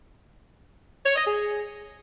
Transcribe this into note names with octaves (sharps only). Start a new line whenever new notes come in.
C#5
D#5
G#4